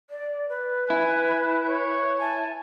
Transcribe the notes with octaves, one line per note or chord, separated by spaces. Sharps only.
D5
B4
E4 G#5
C#5
G#5 A5